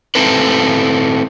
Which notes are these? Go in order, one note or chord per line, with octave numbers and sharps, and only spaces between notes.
A3 C4 E4 A4 B4